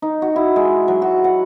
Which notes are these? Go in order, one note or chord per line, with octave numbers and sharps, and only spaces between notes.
D#4
F#4
E4
G#3
F#3
F#4
F#5